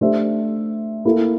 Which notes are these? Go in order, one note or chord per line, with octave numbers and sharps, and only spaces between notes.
A3 D4 G4 C5 E5
A#3 E4 A4